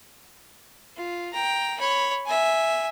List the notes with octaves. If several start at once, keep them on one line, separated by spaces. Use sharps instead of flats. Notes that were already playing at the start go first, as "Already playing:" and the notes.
F4
G5 A#5
C#5 B5
E5 G#5